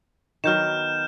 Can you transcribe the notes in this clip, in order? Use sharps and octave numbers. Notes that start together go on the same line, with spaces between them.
D#3 F#3 B3 F6 G6 E7